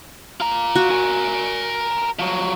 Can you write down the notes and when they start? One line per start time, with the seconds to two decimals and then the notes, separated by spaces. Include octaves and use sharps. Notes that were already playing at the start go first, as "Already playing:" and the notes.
0.40 F4 A#5
0.76 F#4
0.90 A#4 G#5
2.19 F3 F#3